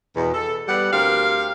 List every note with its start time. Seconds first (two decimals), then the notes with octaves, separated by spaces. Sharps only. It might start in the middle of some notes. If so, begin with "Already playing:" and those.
0.16 E2 B2
0.34 A4
0.68 G3 B3 D5 F#5
0.92 D2 C4 G4 A#4 F5